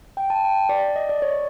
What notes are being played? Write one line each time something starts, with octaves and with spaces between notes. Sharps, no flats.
G5
A5
G5
D5
D#5
D5
C#5